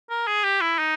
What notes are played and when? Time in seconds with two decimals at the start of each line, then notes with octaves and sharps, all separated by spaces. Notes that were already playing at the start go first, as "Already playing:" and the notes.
0.10 A#4
0.27 G#4
0.44 G4
0.61 E4
0.79 D#4